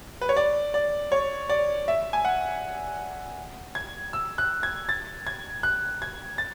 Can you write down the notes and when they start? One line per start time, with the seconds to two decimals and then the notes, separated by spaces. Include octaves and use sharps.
0.21 B4
0.29 C#5
0.37 D5
0.74 D5
1.12 C#5
1.49 D5
1.88 E5
2.13 G#5
2.25 F#5
3.75 G#6
4.13 E6
4.38 F#6
4.63 G#6
4.89 A6
5.27 G#6
5.63 F#6
6.02 G#6
6.38 A6